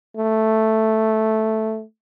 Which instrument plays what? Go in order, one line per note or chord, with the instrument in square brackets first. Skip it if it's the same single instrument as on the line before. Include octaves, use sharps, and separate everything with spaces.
[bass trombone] A3